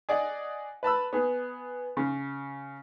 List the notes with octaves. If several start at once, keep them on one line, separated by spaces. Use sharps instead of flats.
G#4 D5 D#5 F#5
B4 A5 B5 E6
B3 G#4
C#3